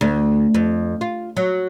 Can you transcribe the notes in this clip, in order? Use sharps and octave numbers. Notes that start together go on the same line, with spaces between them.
D2
F2
F4
F#3